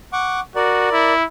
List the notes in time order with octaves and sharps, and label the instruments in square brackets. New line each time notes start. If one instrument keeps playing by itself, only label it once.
[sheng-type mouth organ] F#5 C#6 D6
[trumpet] F#4 [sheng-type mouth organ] A#4 D5
[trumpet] E4